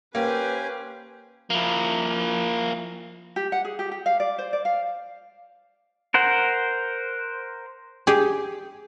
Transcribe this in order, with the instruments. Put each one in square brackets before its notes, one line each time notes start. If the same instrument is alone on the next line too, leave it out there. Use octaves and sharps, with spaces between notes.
[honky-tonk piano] A#3 [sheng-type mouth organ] C#4 G4 G#5 [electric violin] B4 C5
[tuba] F3 [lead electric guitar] A#3 E4
[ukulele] G4
F#5
G#4
G4
G4
F5
D5
C5
D5
F5
[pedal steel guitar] A#4 C5 F#5
[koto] G4 G#4